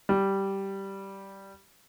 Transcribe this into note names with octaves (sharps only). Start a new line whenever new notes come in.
G3